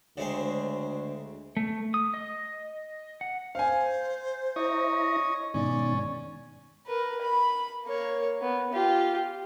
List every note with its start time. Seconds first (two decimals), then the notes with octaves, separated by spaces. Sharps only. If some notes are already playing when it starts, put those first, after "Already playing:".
0.17 D2 C#3 G#3 C4
1.57 A3
1.94 D#6
2.14 D#5
3.21 F#5
3.55 C5 F5 G#5
4.56 E4 C#5 D#5 A#5
5.54 G#2 B2 D#3 C#4 D5
6.86 A#4 B4
7.22 B5
7.85 A#3 C#5
8.41 B3
8.73 F4 G4